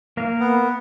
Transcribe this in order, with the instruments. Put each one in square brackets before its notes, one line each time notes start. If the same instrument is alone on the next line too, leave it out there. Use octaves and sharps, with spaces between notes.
[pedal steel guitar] A#3 A#4 F5
[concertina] B3